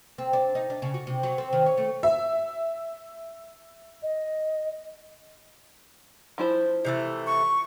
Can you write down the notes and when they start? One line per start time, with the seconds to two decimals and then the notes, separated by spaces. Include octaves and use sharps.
0.18 C4
0.33 D4
0.55 D#4
0.70 D4
0.82 C#3
0.94 F#4
1.07 C3
1.23 F#3
1.38 C4
1.53 D#3
1.66 C#5
1.77 A3
2.03 E5
4.03 D#5
6.38 F3 E4 C5
6.85 C3 E3 A3
7.27 C#6